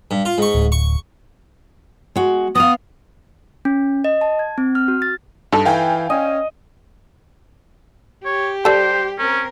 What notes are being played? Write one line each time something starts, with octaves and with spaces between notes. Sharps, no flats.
G2
F4
G#2 C#6
D1
C#6
G#3 F#4
B3 F5 D#6
C#4
D#5
A5
G#6
C4
F6
F#4
A6
G2 D#4 A4
E3 F5 G5 G#5
C#4 D#5
G4 C#5
G3 A4 C5
C4 C#4 A#4